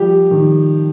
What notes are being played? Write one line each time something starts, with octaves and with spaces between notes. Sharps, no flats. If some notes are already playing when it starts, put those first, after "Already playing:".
Already playing: F3 G3 G4
D#3